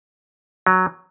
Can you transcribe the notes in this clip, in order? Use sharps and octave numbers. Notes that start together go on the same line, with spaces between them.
F#3